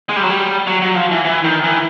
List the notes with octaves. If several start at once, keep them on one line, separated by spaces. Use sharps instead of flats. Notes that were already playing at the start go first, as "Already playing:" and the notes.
G#3
G3
F#3
G3
F#3
F#3
F3
E3
E3
D#3
E3